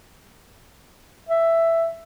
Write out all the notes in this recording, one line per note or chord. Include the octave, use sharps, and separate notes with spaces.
E5